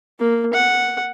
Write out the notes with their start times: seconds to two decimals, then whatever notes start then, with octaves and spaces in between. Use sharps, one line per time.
0.19 A#3
0.54 F#5